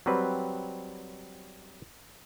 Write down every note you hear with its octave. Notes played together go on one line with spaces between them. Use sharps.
F#3 G3 C4 B4